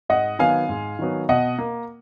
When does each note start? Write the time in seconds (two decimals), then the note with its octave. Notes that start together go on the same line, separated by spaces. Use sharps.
0.09 G#2 D#5 F#5
0.39 D#3 F#3 B3 F5 G#5
0.69 G#2
0.99 D#3 F#3 B3
1.29 B2 D#5 F#5
1.59 A#3